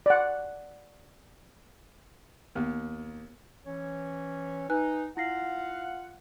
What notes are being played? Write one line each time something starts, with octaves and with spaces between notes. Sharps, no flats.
D5 F#5
D#2 B3
E3 C#4 C#5
D#4 B4 G#5 F#6
E4 F4 F5 F#5 A#6 C7